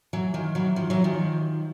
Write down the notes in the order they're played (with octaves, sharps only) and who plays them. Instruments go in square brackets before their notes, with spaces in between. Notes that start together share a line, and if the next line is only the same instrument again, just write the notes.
[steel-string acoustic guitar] E3 F#3
D#3 F3
E3 F#3
D#3 F3
E3 F#3
D#3 F3